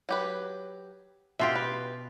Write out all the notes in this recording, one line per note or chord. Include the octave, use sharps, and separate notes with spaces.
F#3 G4 B4
B2 F4 G4 E5
B4